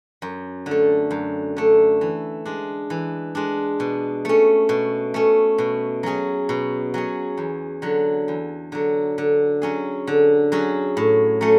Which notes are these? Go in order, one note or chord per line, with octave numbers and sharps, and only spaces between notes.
F#2
D3
A3
F#2
D3 A3
E3
G#3 D4
E3
G#3 D4
B2
A3 C#4
B2
A3 C#4
B2
F#3 C#4 G#4
B2
F#3 C#4 G#4
E2
D3 F#3
E2
D3 F#3
D3
F#3 C#4 G#4
D3
F#3 C#4 G#4
A2
F#3 A3 C#4